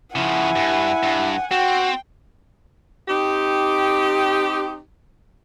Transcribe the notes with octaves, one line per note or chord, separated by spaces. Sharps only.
C#3 F3 E4 F#5 G#5
G2
G2
C4 F#4 G5
C4 D#4 G4